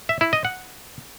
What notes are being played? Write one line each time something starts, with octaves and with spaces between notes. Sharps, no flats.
E5
E4
D#5
F#5